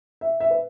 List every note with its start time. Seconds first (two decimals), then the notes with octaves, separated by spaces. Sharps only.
0.21 E5
0.40 E5
0.51 B4